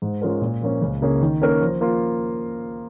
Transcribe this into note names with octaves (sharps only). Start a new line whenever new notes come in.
G#2
G#3 C#4 F4 A#4
A#2
F3 A#3 C#4
C#2
C#3 A#3 C#4 G#4
D#3
A#3 C#4 A#4
F3
A#3 F4